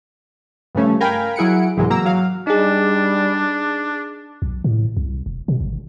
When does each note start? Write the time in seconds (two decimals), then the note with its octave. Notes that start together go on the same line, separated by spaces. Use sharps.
0.75 G2 C#3 F3 A3 C#4
1.01 A#4 F5 G5 G#5 A#5 B5
1.36 F#3 E4 G#4 F#5 C#7 D7
1.77 C2 G#2 C3 E3 F#3 G#3
1.90 F#3 A#3 A#5 E6
2.05 F#3 F5
2.47 G3 D4 D#4 G#4
4.42 B1
4.64 A2
4.97 C2
5.26 E1
5.48 B2
5.61 G#1